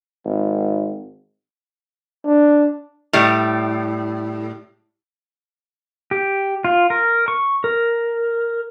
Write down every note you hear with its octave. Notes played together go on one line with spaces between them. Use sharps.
G#1
D4
A2 G3
G4
F4
A#4
C#6
A#4